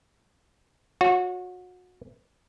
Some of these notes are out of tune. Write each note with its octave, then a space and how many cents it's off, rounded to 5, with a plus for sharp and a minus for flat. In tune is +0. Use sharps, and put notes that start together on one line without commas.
F#4 -30 C#5 +0